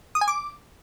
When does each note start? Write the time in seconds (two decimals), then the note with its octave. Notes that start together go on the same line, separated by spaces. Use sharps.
0.15 D#6
0.21 G#5
0.28 D6